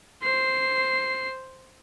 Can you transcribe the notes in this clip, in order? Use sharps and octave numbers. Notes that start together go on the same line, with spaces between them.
C5 C7